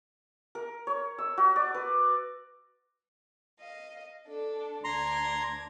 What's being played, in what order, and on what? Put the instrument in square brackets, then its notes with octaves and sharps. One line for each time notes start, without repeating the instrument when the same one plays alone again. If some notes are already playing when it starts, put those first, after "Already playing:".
[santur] A#4
C#5
E6
F#4
D5
B4
[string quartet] D#5 F5
D4 A4
[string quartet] D2 D4 G#6 [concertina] A#5 C6